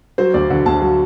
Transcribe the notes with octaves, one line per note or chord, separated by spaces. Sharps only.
F#3 C5
D2 D5
D3 F#5
D2 A5
F#3